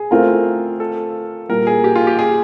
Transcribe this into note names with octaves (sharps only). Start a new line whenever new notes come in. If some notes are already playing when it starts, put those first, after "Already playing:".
Already playing: G#4
A3 C4 F4 A#4
A4
A#2 G3 A#3 A#4
G#4
G4
F4
G4
G#4